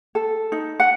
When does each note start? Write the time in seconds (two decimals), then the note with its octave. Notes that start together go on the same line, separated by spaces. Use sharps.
0.15 A4
0.52 D#4
0.80 F#5